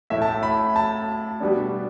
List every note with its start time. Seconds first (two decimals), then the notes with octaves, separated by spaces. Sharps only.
0.10 A2 A3 E4 E5
0.22 A5
0.43 B5
0.76 A5
1.40 B2 G3 B3 D4